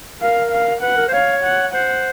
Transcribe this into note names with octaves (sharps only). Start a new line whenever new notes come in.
A#4 F5
F5
B4 F#5
A#4
C5
C#5 F5
F#5
C5 F#5